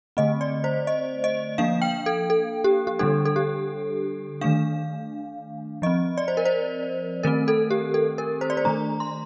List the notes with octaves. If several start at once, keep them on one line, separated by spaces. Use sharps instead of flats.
D3 A3 C4 D#5
D5
C5
D#5
D#5
F3 A#3 D4 F5
G5
A4
A4
G4
G4
D3 G3 D4 A4
A4
G4
D#3 A3 D4 F5
F3 C4 D#5
D5
C5
A#4
C5
D#3 A3 C4 A#4
A4
G4
A4
A#4
C5
D5
C5
D#3 A3 D4 A#5
C6